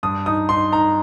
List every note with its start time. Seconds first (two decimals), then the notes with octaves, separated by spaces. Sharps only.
0.03 G2 D#6
0.26 D#4 D#6
0.49 D#4 C6
0.72 D#4 A#5